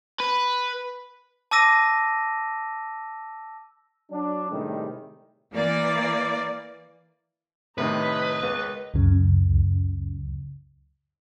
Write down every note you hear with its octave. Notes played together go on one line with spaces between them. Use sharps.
B4
A5 D6 E6 A#6 D#7
F#3 D4
A2 C3 D#3 G3 G#3
E3 A#3 D5
A2 C3 D#3 A#4 B4 D#5
C#2
C#2 F#2 C#3